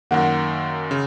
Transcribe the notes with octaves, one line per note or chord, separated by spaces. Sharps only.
F#2 D#3 A#3 F#5
C#3